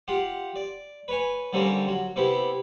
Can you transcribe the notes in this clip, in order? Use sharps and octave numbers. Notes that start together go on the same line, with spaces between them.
F4 G4 F#5
D5
B4 C#5 G#5
D3 G3 A#3 C4 C#4
F#3
C3 B3 E4 G4